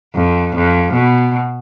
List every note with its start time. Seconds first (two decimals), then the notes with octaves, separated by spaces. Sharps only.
0.15 F2
0.55 F2
0.94 B2